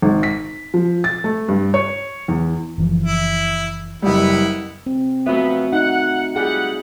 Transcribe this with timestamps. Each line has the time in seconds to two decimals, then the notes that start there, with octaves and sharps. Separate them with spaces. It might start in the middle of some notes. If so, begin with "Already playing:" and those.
0.02 G#1
0.23 B6
0.74 F3
1.04 A6
1.24 A3
1.48 G2
1.74 C#5
2.28 E2
2.78 F#1 E3 F3
3.04 E4
4.02 F#1 G3 B3 E4
4.86 C4
5.27 F3 F#3 A3 B3 F#4 E5
5.73 D#4 F#5
6.36 G3 F4 G#4 F#5